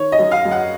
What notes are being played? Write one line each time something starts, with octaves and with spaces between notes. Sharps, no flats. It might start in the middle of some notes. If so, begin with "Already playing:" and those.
Already playing: D#3 C#5
D#5
F#2
F5
F#2
F#5